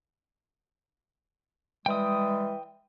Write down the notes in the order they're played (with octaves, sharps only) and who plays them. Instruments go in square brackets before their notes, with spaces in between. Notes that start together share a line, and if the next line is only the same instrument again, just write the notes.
[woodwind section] E3 G3 G#3 [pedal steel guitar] G5 D#6